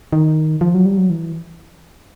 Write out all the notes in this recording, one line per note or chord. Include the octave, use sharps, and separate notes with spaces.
D#3
F3
F#3
G3
F#3
E3